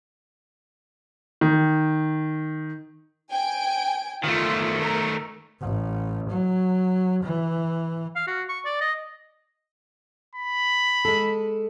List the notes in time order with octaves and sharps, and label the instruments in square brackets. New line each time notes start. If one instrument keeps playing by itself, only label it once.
[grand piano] D#3
[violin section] G5 G#5 D7
[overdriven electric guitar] D#3 A3 [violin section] F4
[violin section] A#4
[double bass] A1
F#3
E3
[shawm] F5
F#4
C#6
D5
D#5
[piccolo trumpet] B5
[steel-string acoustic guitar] G#3 A4